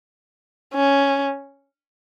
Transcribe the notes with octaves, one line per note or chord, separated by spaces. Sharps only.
C#4